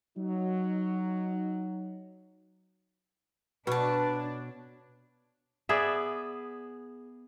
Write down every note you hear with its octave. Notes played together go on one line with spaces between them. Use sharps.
F#3 D#4
B2 D4 B4 C#5 A5
B3 G#4 D5 E5